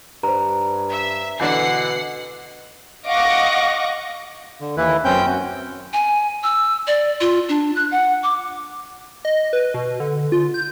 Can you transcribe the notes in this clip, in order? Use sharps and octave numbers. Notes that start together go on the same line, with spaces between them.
G2 C5 A#5
E5
B2 D3 E3 F#5 C7
D#5 F5 F#5 C#6 D6 A#6
D3
D#2 E3 E4 B4
F#2 C4 C#4 G5 G6
F#4
G#5
E6
D5
F4
D4
F#6
F#5
D6
D#5
B4
B2
D3
F4
G6